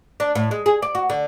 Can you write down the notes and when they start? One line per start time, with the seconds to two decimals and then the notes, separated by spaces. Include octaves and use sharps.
0.20 D4
0.35 A2
0.51 G#3
0.66 G#4
0.82 D5
0.95 F#4
1.10 D3